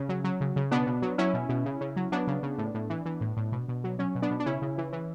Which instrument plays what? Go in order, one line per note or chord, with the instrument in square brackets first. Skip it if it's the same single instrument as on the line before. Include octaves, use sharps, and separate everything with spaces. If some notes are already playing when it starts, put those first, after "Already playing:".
Already playing: [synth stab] C#3 C#4
F#3
F#3
C#3
C#3
B2 B3 D4
B2
F#3
F#3 C#4 E4
B2
B2
C#3
C#3
F#3
F#3 B3 D4
C#3
C#3
A2
A2
E3
E3
A2
A2
B2
B2
F#3
F#3 C#4
B2
B3 D4
B2
D4
C#3 C#4 E4
C#3
E3
E3